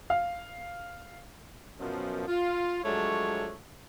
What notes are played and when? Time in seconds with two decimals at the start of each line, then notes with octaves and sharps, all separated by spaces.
0.10 F5
1.78 F#2 B2 F3
2.27 F4
2.82 F3 F#3 G#3 A3 D4 C#5